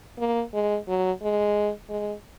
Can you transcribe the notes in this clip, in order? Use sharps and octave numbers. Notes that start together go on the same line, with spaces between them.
A#3
G#3
F#3
G#3
G#3